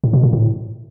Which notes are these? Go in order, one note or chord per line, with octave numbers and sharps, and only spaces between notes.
A2
B2
A#2
A2